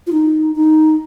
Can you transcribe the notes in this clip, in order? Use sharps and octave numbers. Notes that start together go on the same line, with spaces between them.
F4
D#4
D#4